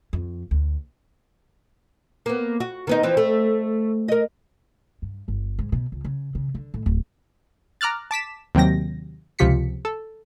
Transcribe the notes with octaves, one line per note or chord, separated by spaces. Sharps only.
F2
D2
A#3 B3
F#4
D#3 B3 D#4
E3 F3 C4
A3
A#4 D#5
G2
G1
G#2
B2
C#2
C#3
C#3
D3
A2
D1
A#5 D6 F6 F#6 A6
A5 D6 B6 E7
D#2 C3 F#3 G5 A#6
C#2 C3 F3 G4 B6 C#7
A4